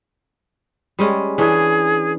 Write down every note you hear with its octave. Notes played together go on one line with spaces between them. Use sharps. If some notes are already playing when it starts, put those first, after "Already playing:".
G3 G#3 C#4
E3 C#4 D4 G#4